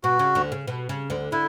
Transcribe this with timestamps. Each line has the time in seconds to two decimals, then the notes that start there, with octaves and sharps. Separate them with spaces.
0.04 B2 F#4
0.19 C#3
0.35 D2 D3
0.52 C#3
0.67 B2
0.89 C#3
1.10 D2 D3
1.32 D3 E4